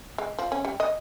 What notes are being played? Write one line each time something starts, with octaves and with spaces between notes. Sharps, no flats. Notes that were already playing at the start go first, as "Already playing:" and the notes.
G#3
F3
C#4
G3
D#5